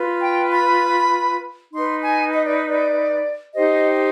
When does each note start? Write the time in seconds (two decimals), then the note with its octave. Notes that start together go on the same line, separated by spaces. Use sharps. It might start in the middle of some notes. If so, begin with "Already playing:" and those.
Already playing: F4 B4
0.21 G5
0.52 B5
1.73 D#4 B4 C6
2.03 G#5
2.34 D#5
2.45 D5
2.68 D5
3.54 D#4 G4 C5 D#5